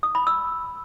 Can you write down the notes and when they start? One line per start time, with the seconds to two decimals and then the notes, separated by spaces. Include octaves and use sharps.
0.03 D#6
0.15 B5
0.27 E6